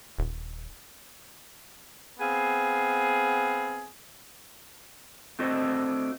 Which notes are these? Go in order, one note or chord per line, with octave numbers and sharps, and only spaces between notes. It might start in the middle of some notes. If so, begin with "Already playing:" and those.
D#1
B3 C4 G#4 F5
A3 C4 D4 F#4 C5 D#5